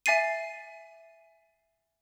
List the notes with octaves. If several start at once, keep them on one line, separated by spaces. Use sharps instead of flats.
E5 G#5 A6 C7 D#7